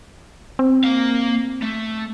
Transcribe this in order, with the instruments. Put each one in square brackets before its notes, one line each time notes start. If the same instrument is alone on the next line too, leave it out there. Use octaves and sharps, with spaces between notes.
[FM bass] C4
[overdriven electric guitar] A#3 F5
A3